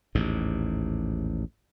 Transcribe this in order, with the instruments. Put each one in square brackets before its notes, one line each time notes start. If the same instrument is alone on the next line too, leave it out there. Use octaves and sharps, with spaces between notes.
[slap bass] A1 D#2 G#2